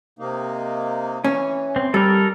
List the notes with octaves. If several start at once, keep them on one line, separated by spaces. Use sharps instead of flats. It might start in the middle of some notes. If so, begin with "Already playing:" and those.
C3 A#3 D#4
E3 C#4
C4
G3 A4 A#4